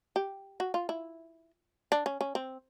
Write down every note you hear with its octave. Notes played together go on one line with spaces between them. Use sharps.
G4
F#4
F4
E4
D4
C#4
C#4
C4